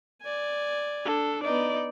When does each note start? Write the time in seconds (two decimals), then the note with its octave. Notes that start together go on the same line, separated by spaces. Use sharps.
0.22 D5 G#5
1.05 D4 A4
1.44 B3 D#4 D5